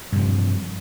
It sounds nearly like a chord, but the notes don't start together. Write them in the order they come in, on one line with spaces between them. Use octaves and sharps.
G2 C3 F3